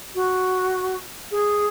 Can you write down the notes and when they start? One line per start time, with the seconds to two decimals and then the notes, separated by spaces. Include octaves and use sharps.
0.15 F#4
1.31 G#4